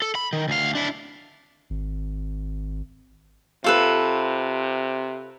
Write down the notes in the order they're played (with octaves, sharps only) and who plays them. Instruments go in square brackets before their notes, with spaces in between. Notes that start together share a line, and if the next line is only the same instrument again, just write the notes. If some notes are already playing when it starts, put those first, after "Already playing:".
[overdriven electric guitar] A4
B5
D#3
D2 F5
D4 E4
[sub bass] G#1
[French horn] C3 [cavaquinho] F4 A4 B4